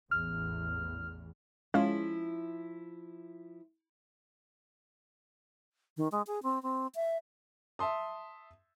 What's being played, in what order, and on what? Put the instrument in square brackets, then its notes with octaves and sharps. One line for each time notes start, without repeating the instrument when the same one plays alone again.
[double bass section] A1 E2 [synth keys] F6
[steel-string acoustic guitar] F3 E4 [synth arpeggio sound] G#3 C#4 F4
[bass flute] D#3
G#3
G#4
C4
C4
E5
[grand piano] E5 A5 C6 D#6